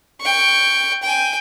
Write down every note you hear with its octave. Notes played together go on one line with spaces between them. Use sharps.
G5 C#6
G5 G#5